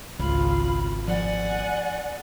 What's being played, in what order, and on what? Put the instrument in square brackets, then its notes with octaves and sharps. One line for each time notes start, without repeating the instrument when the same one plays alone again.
[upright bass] G#1 [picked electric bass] C#2 [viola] F4 [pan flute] B5
[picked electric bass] F3 [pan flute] D5 [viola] F#5 G#5